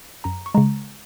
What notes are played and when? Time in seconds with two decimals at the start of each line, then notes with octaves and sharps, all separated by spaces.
0.24 F#2 A#5
0.46 C#6
0.55 C#3 G#3 A#5